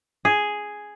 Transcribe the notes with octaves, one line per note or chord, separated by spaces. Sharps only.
G#4